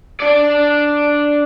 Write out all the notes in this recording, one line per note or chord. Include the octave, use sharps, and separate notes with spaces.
D4 D5